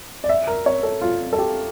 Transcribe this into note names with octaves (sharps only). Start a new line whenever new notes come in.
D5
E5
A#4
C#5
A4
F4
A4
G4